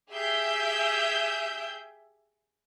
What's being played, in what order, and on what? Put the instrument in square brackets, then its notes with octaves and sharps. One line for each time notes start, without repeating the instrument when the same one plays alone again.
[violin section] G4 G#4 E5 G6